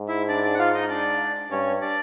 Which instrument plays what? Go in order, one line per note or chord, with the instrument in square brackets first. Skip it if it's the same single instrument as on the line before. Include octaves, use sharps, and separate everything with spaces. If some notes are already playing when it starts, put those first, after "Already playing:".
Already playing: [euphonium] G#2
[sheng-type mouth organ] E4 E5
D4 D5
D4 D5
F#5
F4 F5
D#4 D#5
D4 D5
[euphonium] G2 [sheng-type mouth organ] C#4 C#5
[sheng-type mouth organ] D4 D5